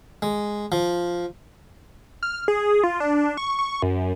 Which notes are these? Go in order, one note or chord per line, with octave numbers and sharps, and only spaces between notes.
G#3
F3
F6
G#4
F4
D4
C#6
C#6
F#2